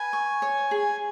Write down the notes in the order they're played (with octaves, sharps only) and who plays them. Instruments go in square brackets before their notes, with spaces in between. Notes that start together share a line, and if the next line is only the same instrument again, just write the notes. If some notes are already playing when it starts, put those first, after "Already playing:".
Already playing: [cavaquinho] B4 [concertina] G#5
[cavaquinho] C#6
C#5
G#4